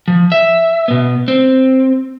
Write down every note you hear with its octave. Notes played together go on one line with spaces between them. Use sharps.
F3
E5
B2 B3
C4